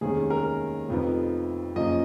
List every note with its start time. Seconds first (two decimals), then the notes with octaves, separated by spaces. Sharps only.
0.01 F1 D#2 D#3 G#3 C#4 G#4
0.30 A#4
0.89 F1 F2 F3 B3 D#4
1.76 F#2 C#3 F3 A#3 D#5